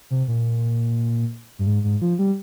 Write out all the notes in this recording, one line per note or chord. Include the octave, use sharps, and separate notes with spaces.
C3
A#2
G2
G#2
G#2
F3
G3